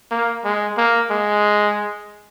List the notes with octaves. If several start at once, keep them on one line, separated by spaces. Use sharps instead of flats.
A#3
G#3
A#3
G#3